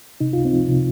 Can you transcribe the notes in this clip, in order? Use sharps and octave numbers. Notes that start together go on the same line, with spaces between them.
C3 D#4
C#2 F4
C4 D#4
F3
C3